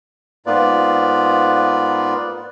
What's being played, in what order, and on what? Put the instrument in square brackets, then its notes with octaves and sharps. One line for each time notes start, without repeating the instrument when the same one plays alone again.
[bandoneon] G#2 A#3 B3 F4 B4 D5